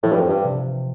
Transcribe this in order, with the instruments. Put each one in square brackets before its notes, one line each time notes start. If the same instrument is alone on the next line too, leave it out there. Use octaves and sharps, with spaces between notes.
[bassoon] A2 [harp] F3
[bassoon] G2
F2
G2
[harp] C3